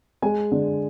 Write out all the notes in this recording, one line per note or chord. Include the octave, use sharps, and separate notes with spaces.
G#3 G#5
D3